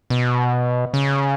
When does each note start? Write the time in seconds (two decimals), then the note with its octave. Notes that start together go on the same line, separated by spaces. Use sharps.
0.10 B2
0.94 C#3